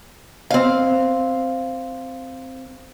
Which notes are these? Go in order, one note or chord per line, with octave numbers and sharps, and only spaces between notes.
C4 F5